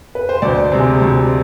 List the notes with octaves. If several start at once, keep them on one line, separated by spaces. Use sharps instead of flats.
B4
C5
D2 D5
C3 G#3
D2